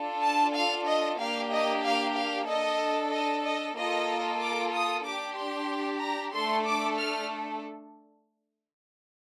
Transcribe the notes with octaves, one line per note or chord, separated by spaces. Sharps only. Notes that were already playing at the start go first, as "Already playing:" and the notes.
Already playing: D4 F4 A4
A5
F5
D#5
A#3 D4 G4 F5
D#5
F5
F5
D4 A4 D#5
D#5
D#5
A#3 F4 A4 D#5
D6
D#6
D4 G4 D6
C6
A#5
A3 D4 A4 C6
D6
F6